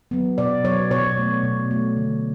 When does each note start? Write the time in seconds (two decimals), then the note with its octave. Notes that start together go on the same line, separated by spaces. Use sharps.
0.11 F#3 B3
0.38 B2 D5
0.64 F#3 B3 C#5
0.91 B2 C#5
1.17 A3
1.44 B2
1.71 A3
1.97 D3